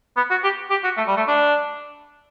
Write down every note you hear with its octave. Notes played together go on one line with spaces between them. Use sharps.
B3
F#4
G4
G4
F#4
A3
G3
A3
D4